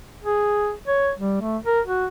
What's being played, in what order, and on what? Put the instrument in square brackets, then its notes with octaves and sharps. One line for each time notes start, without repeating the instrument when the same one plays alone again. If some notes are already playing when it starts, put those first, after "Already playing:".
[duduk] G#4
C#5
G3
A3
A#4
F#4